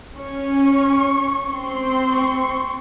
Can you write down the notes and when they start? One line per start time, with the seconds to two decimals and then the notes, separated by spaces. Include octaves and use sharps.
0.19 C#4 C#6
1.50 C4 C6
2.10 C#6